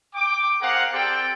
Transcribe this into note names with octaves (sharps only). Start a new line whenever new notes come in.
G5 D6
C4 G#4 A#4 F5 F#5
C4 G4 A4 D5 G5